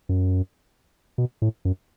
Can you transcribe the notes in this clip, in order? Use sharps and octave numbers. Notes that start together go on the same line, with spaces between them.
F#2
B2
A2
F#2